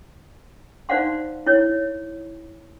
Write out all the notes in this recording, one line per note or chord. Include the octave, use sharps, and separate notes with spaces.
D#4 C5 D5 F5 F#5 C6
E4 C#5